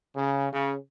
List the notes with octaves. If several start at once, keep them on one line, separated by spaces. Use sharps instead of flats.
C#3
C#3